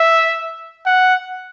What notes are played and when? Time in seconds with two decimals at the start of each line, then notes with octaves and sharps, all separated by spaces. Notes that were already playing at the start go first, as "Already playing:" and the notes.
Already playing: E5
0.86 F#5